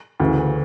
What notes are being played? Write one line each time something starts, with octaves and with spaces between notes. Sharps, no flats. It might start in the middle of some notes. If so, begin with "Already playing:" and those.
D2 C#3 E3